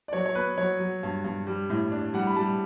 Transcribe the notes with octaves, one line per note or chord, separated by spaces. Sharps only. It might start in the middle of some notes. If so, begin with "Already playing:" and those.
D5
F#3 C#5
C#5
B3 B4
F#3 C#5
F#3
G2
G2
G3
A2
D4
G3 F#5
B5
G3 A5